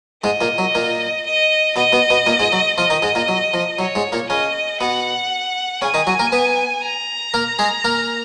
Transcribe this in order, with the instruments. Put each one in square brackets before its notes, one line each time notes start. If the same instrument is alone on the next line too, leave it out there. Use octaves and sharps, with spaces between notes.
[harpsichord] G#2 G#3 [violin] D#5
[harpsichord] A#2 A#3
F#3
A#2 A#3
[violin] D#5
[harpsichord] B2 B3 [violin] D#5
[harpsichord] B2 B3
B2 B3
A#2 A#3
G#2 G#3
F#3
[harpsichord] F3 F4 [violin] D#5
[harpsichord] D#3 D#4
G#2 G#3
A#2 A#3
F#3
F3
[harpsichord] F#3 [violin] C#5
[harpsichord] G#2 G#3
A#2 A#3
[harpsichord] C#3 C#4 [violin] D#5
[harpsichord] B2 B3 [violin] F#5
[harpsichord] C#3 C#4 [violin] G#5
[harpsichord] D#3 D#4
F#3 F#4
A#3 A#4
B3 B4
[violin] A#5
[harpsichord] A#3 A#4
G#3 G#4
A#3 A#4